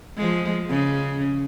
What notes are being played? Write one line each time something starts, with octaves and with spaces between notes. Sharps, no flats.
F3 G#3
C#3